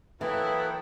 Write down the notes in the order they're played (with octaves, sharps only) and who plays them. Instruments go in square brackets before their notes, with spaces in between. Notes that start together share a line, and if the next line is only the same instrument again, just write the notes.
[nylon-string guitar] E3 [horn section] F#3 A#3 E4 [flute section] A4 G5 D#6 [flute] B4